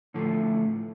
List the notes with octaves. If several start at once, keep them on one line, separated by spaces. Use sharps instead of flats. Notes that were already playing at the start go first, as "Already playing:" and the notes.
A2 D3 F3 A3